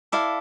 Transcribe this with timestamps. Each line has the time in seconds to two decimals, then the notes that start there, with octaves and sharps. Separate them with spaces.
0.12 E4 A4 D5 F5